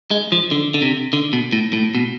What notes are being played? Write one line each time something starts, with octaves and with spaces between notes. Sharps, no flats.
G#3
F3
D3
D3
C3
D3
B2
A2
A2
B2